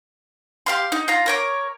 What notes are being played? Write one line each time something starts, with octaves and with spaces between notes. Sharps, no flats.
G4 F5 C6
D#4
F4 A#5
A#4 C#5 D6